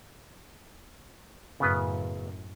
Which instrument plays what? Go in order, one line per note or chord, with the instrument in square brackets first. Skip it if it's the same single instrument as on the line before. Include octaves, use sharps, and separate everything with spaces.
[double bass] F#2 A2 [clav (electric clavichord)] C#3 B3 B4